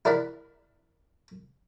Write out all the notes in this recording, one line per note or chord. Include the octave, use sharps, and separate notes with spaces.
E4 A#4 D5 F#5 B5